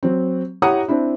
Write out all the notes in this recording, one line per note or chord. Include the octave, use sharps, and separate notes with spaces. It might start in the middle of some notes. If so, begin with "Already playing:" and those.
F#3 C4
E4 G4 C#5 F#5 A#5 D#6
C4 D4 E4